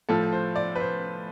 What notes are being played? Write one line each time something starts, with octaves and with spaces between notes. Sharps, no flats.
A2 F3 A4
C5
D5
B4
C5